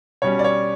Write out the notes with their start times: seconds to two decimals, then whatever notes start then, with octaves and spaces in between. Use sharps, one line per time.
0.22 B2 G3 C#4 C#5
0.39 D5
0.44 C#5